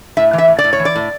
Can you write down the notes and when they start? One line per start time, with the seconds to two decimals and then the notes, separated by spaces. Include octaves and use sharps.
0.17 A2 E5
0.33 E3
0.38 E5
0.48 A2
0.58 D5
0.64 A2
0.73 C#5
0.79 E3
0.85 D5
0.96 A2